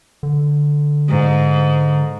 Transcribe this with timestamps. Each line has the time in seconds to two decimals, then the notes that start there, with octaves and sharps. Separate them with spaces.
0.23 D3
1.09 G#2